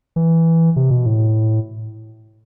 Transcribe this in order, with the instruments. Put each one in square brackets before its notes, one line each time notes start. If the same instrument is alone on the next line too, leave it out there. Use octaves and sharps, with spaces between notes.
[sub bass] E3
C3
B2
A2